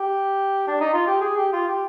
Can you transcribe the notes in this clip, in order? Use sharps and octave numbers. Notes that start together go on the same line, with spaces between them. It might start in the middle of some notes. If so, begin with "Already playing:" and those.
Already playing: G4
D4
D#4
F4
G4
G#4
G4
F4
G4